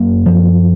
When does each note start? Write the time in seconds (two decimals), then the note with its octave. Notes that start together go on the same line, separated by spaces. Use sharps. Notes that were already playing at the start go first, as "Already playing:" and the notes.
Already playing: F#2 A#3
0.26 F3